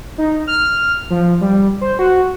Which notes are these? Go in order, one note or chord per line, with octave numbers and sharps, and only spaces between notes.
D#4
F6
F3
G3
C5
F#4